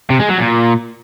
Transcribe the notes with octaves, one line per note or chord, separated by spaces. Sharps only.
C3
G#3
F#3
A#2